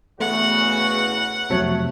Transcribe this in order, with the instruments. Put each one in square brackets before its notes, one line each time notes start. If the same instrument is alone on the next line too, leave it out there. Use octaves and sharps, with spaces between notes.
[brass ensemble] E2 C#3 F#4 [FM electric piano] A3 [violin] F#5
[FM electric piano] F2 C3 [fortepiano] F#3 A3 C#5